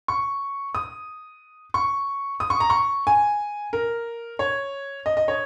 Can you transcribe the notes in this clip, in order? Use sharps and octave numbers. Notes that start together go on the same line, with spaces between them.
C#6
D#6
C#6
D#6
C#6
A#5
C#6
G#5
A#4
C#5
D#5
D#5
C#5